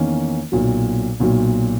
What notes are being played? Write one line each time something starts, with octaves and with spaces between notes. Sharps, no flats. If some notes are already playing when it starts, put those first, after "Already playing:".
Already playing: E2 D#3 A#3 C#4
B1 A#2 F#3
B1 A#2 F#3